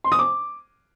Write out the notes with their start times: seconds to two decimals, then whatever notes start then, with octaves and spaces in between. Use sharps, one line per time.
0.04 C6
0.12 D#6
0.19 D6